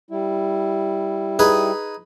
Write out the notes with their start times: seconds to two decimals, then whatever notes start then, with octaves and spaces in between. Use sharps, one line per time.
0.11 G3 E4
1.39 D#4 G#4 B4